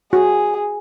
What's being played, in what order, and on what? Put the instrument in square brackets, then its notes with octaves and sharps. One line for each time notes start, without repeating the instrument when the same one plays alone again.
[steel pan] F#4 [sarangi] G#4